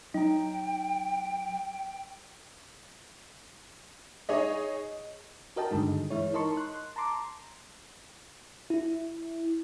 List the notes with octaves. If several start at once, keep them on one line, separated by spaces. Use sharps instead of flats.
F#3 D#4 G5 A#5
D#4 G#4 C#5 D#5
F#4 A#4 D#5 G5 A5
G2 D3 D#3 G#3 D#4
E3 G#3 E4 C#5
D#4 A#4 D#5 A5 C6 C#6
C6 F#6
A5 A#5 C6 D6
E4